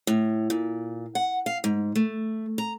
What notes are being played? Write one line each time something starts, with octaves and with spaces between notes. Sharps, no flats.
A2
A#2
F#5
F5
G#2
A3
A#5